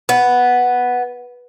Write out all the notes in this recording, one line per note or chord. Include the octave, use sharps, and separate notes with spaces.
B3